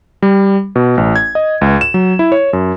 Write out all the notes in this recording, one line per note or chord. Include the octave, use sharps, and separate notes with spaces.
G3
B2
A1
G#6
D#5
C#2
E7
F#3
E4
C#5
F#2